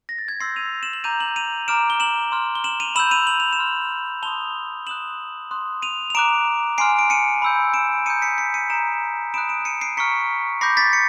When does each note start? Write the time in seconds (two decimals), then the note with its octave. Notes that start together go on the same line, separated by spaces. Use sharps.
0.09 A#6
0.18 A6
0.28 G#6 A#6
0.40 C6 E6 G6 A#6 C7
0.56 D#7 F7
0.83 E7 F#7
0.93 E7 F#7
1.04 A#5 D6 G6 D#7 F7
1.20 E7 F#7
1.36 D#7 F7
1.68 A#5 D6 F6 D7 E7
1.90 G7
2.00 E7 F#7
2.32 C6 F6
2.55 G7
2.64 E7 F#7
2.80 D#7 F7
2.95 B5 E6 G6 E7 F#7
3.11 D#7 F7
3.27 F#7
3.40 F7
3.52 E7 F#7
3.59 C6 F6
4.23 A5 C6 D#6 F7 G7
4.87 C6 D#6 F#6 E7 F#7
5.51 C6 D#6 F#6
5.82 D#7 F7
6.10 F7
6.15 A#5 D6 F#6 D7 E7
6.78 G#5 C6 F6 C7 D7
6.99 D7
7.10 C#7 D#7
7.42 B5 E6 G6
7.74 D7 E7
8.06 A#5 D#6 G6 C#7 D#7
8.22 B6 C#7
8.38 B6 C#7
8.54 C#7 D#7
8.69 A#5 D#6 G6 D7 E7
9.34 B5 D#6 F#6 D7 E7
9.49 D7 E7
9.65 C#7 D#7
9.81 C7 D7
9.97 A#5 C#6 F6 B6 C#7
10.61 B5 D6 G6 A#6 C7
10.77 A6 B6
10.93 B6 C#7